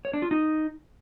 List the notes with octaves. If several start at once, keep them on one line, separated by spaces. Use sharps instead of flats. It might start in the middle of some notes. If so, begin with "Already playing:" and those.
C#5
D4
F4
D#4